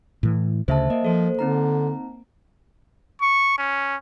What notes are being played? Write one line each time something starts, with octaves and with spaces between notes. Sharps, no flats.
A2 E3
D2 C#3 C5 E5 A5
A#3 D#5
F3 A4 C5
D3 C4 D#4 A#5
C#6
C#4